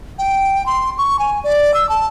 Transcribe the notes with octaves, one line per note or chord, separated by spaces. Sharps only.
G5
C6
C#6
G#5
D5
E6
A5